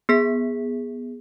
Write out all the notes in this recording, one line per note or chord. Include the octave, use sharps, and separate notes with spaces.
B3 G#4 B6